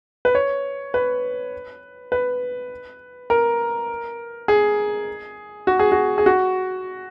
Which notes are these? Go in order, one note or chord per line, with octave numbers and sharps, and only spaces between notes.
B4
C#5
B4
B4
A#4
G#4
F#4
G#4
F#4
G#4
F#4